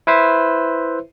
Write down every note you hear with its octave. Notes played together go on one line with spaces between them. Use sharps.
E4 B4 C5 E5